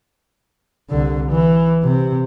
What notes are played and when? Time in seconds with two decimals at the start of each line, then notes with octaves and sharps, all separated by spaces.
0.90 C2 D3
1.31 E3
1.83 C3